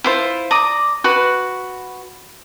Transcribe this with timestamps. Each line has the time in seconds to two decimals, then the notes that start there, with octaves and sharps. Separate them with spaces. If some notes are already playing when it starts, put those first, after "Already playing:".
0.04 E4 F4 C5
0.51 D5 A#5 D#6
1.04 F#4 B4